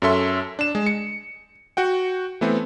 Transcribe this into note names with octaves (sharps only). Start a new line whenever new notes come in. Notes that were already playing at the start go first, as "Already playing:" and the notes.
F#2 C#4 A4 E5 C6
D4 E7
G#3
C#7
F#4 F#5 G5
E3 A3 B3 C4